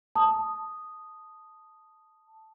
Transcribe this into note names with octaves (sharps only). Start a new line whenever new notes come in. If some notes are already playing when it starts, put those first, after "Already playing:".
A5 D#6